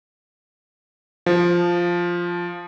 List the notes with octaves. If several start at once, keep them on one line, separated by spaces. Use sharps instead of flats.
F3